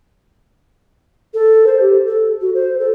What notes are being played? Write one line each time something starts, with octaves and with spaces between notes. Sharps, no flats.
A4
C5
G4
A4
F#4
C5
A4